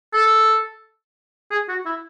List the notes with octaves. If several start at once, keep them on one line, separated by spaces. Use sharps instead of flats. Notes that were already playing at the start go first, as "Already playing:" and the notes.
A4
G#4
F#4
E4